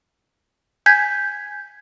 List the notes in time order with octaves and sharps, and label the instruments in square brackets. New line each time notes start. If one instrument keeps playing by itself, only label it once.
[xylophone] G#5 G6 G#6 B6